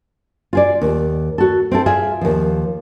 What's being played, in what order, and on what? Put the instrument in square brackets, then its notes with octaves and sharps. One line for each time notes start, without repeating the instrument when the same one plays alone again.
[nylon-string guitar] F4 G#4 D5
D#2
F#4 A4
C4 E4 A4
F4 G#4 E5
D#2 F3